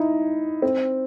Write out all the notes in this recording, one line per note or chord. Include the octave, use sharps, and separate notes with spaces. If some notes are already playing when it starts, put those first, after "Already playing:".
Already playing: D#4 E4
C4